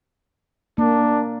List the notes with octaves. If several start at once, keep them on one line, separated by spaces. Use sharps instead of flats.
A#3 D4